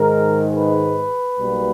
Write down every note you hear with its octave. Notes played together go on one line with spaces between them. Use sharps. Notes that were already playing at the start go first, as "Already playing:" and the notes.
Already playing: G#2 D#3 G#3 A#4
B4
B1 B2 G3 A#3